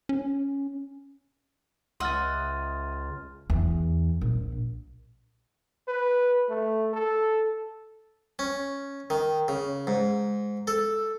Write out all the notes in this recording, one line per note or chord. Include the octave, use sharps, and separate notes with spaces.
C#4
C#2 D#5 E5 F#5 C6 F6 A6
E2
A#1
B4
A3
A4
C#4
D#3
C#3
G#2
A4